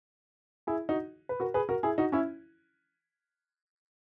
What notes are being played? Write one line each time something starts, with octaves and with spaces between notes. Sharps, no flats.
E4 G#4
D#4 F#4
B4
F#4 A#4
G#4 B4
F#4 A#4
E4 G#4
D#4 F#4
C#4 E4